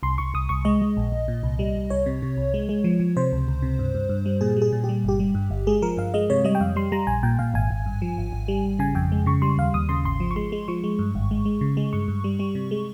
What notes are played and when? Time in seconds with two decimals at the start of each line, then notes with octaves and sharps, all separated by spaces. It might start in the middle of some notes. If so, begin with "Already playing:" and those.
0.03 C2 C6
0.18 C2 C#6
0.34 C2 D#6
0.49 C2 C#6
0.65 G#3 D#5
0.81 G#3
0.97 A#1
1.12 A#1
1.28 A#2
1.43 C2
1.59 G3
1.76 C2
1.90 C2 C#5
2.06 C3
2.22 C3
2.37 C2
2.54 G#3
2.69 G#3
2.84 F3
3.00 F3
3.17 C3 C5
3.32 C#2
3.48 C#2
3.62 C3
3.79 G2
3.95 G2
4.09 G2
4.26 G3
4.41 A#2 G#4
4.56 G3
4.62 G#4
4.72 A#2
4.84 G4
4.89 G3
5.04 G1 G4
5.20 G3
5.35 G2
5.50 G1
5.67 G#3 G#4
5.82 F3 A#4
5.97 G2 F5
6.14 G#3 D#5
6.30 C3 C#5
6.44 G3 D#5
6.55 G5
6.61 F2 F5
6.76 G3 C6
6.92 G3 A#5
7.07 A#1 G#5
7.23 A#2 G5
7.39 A#2 F5
7.54 G#1 G#5
7.70 G#1
7.86 G2
8.02 F3
8.18 G#1
8.32 G#1
8.48 G3
8.65 G#1
8.79 C#3 G#5
8.95 F2 G5
9.12 G#3
9.26 C#3 C#6
9.42 G3 C6
9.58 D#2 F5
9.74 D#2 D#6
9.89 C#3 C6
10.05 G#1 C6
10.20 F3
10.31 C#6
10.36 G#3 C6
10.52 G#3
10.68 F3 C#6
10.84 G#3
10.99 G2
11.15 G#1
11.31 G#3
11.45 G#3
11.61 C#3
11.77 G#3
11.93 G2 C#6
12.08 G2
12.24 G3
12.39 G3
12.55 C3
12.71 G#3